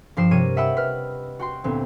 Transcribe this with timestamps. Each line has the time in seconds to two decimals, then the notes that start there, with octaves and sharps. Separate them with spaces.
0.17 G2 F3 G4 C7 E7
0.31 C3 G3 A#4 C#5 D#7
0.56 D#5 E5 F#5 G5 B5 E6
0.77 B4 F6
1.39 F#4 G5 C6
1.64 D2 A#2 B3 C4